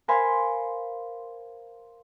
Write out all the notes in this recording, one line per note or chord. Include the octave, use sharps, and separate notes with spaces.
A#4 C5 F5 G#5 B5 C6